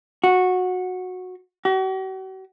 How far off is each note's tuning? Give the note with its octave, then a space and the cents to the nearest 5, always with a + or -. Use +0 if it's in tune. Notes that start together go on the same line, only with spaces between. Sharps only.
F#4 -15
F#4 +45